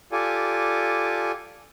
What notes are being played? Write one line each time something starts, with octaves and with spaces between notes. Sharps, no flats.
F4 G4 A4 D5 G#5